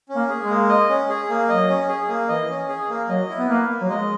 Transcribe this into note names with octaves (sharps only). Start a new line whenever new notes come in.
C#4
A#3
G#4
G#3
A#3
D#5
C#4
G#4
A#3
F#3 D#5
C#4
G#4
A#3
E3 D#5
C#4
G#4
A#3
F#3 D#5
E4
B3
A#3 B4
A#3
F#3
G#3 D#5